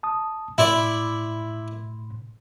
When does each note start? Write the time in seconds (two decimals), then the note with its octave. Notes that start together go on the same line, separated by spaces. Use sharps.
0.03 A5 D#6
0.58 A2 E4 D5 B5 C6